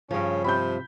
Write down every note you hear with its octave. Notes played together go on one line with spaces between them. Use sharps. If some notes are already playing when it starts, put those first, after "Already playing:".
G2 C#3 F3 C#4
C3 B5 G6